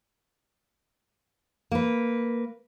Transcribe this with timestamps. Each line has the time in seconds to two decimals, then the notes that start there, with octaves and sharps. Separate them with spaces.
1.71 A#3 B4